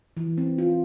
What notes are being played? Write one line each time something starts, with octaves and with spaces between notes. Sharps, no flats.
E3
C4
F4